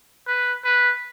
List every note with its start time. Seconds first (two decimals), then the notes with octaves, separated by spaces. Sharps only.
0.27 B4
0.64 B4